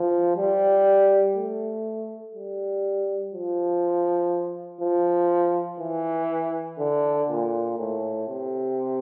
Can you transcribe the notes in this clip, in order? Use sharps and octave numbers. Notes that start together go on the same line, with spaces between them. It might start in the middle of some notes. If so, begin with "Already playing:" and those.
Already playing: F3
G3
A3
G3
F3
F3
E3
D3
A#2
A2
C3